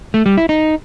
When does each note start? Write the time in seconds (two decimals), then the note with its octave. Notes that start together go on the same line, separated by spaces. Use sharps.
0.14 A3
0.26 G3
0.37 E4
0.49 D#4